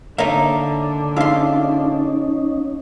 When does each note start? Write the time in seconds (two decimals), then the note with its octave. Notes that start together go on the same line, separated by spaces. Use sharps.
0.18 D3 A#3 D4 D#4 C#5 E5
1.16 C#4 D#4 F4 G#4 E5 F5 C6